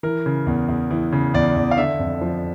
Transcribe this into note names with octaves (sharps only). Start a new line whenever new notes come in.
E3 A#4
C#3
E2
E2
E3
C#3
E2 D5
E2
F5
D3 E5
F2
F3